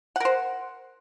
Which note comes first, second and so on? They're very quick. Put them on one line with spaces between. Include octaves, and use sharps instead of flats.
F#5 A#4 C5